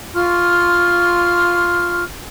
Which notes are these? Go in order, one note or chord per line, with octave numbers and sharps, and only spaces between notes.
F4 C6 C#6 F6